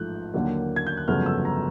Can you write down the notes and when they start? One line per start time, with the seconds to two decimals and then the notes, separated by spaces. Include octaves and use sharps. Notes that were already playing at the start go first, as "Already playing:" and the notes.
Already playing: A1 G#2 F3 A3 F#6 G6
0.34 D#2 D3 F#3 A#3
0.76 G#6
0.87 G6
0.97 F#6
1.08 G1 F2 C#3 F#3 A3 F6
1.26 E6
1.45 A#5